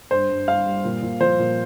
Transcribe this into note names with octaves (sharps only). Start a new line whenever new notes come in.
G2 C5
G2
G2 F5
G3
A#2
A#2
F3 C5
A#2